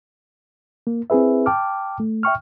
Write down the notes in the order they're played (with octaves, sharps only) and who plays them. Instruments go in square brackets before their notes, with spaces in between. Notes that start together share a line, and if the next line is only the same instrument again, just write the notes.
[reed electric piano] A#3
C4 E4 G#4 B4 E5
G5 A5 D6 F6
A3
E5 G5 C#6 F6